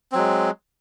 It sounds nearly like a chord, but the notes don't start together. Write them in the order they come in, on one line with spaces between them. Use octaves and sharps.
C4 F#3 G#3